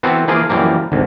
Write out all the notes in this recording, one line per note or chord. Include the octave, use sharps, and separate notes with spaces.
E3 B3 C4 F#4 A4
E3 F3 A#3 F4 G#4
F#2 E3 F3 G3 A#3
G#1 D2